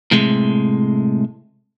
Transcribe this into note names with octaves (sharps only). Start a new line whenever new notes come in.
A2 C3 G#3